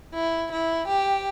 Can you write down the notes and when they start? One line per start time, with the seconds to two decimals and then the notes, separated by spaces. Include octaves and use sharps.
0.14 E4
0.51 E4
0.88 G4